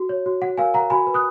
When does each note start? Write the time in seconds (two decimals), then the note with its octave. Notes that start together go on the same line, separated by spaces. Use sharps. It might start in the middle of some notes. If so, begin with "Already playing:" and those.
Already playing: F#4
0.09 C#5
0.26 F#4
0.42 F#4 F#5
0.58 A#4 F5 G#5
0.74 A#4 F#5 A#5
0.90 F#4 G#5 B5
1.07 B4
1.14 D#6 F#6